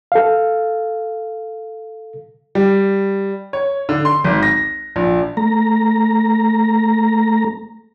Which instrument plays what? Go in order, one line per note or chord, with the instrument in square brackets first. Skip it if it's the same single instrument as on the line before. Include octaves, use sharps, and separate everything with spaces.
[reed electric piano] A4 F5
[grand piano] G3
C#5
D3
C6
G#1
A#6
A#1
[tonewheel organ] A3 A#5